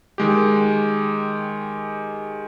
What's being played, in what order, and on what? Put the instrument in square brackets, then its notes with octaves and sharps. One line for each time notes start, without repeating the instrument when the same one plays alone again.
[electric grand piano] D#3 G#3 G4